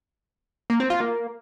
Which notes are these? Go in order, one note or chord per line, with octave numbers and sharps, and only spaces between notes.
A#3
C4
F4
A#3